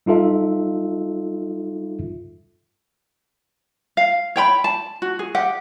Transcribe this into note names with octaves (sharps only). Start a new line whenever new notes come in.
G3 D#4 F4 A4 E5
F5
C#5 G5 B5
A5
F#4
G#4
G4 F#5